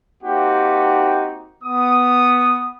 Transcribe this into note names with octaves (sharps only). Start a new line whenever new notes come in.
A#3 C4 D#4 F#4 G4
B3 D#6